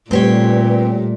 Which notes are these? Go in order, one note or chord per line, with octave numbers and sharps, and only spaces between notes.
A#2 G3 A3 C4 G4 B4 C#5